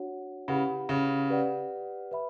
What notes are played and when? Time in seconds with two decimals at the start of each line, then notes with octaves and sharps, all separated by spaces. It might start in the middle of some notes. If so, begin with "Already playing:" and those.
Already playing: D4 F#4 C#5 F#5
0.48 C#3 E4 G4 B4 F#5 B5
0.89 C#3
1.30 G4 B4 D5 F#5
2.11 B4 E5 B5